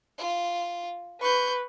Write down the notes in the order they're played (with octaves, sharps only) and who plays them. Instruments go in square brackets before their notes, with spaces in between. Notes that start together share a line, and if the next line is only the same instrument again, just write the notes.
[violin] F4
[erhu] B4 [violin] C#6 G6